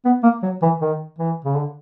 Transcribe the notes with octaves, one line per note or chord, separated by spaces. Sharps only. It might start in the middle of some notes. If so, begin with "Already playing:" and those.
B3
A#3
F#3
E3
D#3
E3
C#3
D3